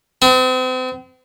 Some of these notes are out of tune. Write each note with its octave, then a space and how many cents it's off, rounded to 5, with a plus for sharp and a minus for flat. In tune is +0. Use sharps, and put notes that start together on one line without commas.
C4 -40